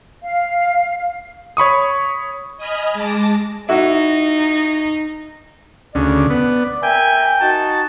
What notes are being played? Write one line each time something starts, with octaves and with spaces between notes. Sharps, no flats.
F5
C#5 B5 C#6 D#6
D#5 G#5 B5 D#6 F6
G#3 A5 D6 A#6
D#4 E4 F#4
D2 C#3 D5
B3
A#4 E5 G5 G#5
D#4 F#4 A5